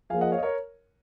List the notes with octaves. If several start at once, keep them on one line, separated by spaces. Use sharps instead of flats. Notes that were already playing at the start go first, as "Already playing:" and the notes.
F3 A#3 F4 G#4 F5 G#5
D#5 F#5
C#5 F5
D#5
A#4 C#5